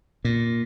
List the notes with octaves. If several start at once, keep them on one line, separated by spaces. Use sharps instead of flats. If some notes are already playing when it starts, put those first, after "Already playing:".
A#2